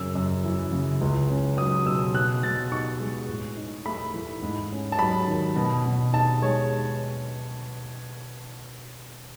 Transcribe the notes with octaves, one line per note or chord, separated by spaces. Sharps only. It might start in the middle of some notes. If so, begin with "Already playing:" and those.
Already playing: F#2 C#3 E6
F#2
E3
C#3
C#2
C#4
F#3 D#6
B2 E6
B2 F#6
B2 A6
D#4 C#6
G#3
A2
D#4
A3 B5
E3
G#2
C#4
A5
F#3 B5
D#3
B2
B2
D#4 A5
G#3 C#5